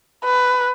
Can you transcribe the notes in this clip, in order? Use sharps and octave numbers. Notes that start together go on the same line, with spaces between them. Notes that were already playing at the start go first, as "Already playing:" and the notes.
B4